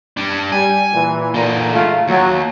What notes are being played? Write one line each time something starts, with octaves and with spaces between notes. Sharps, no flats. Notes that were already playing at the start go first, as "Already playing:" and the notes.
G3 D4
G3 G#5
A#2 E3
A#2 D3 D#4
G#3 A3 F4
D#2 F#3